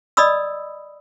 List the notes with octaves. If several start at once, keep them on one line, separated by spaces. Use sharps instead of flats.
D5 D#5 B5 D#6 E6